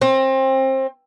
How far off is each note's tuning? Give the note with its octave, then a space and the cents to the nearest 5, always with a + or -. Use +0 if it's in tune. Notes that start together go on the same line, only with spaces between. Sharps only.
C4 +25